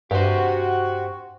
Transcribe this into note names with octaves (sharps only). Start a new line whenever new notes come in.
G2 F#4 G4 C5